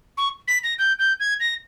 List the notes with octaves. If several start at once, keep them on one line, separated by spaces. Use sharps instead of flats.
C#6
B6
A#6
G6
G6
G#6
A#6